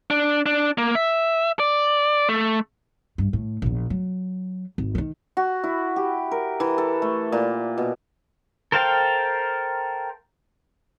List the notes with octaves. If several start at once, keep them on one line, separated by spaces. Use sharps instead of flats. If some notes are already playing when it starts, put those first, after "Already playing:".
D4
D4
A#3
E5
D5
A3
G2
A2
A#1 E2
F#3
G#1
D#3 E3
F#4
E4
G4
A#4
E3
A4
A3
A#2
B2
A4 A#4 C5 F5 G5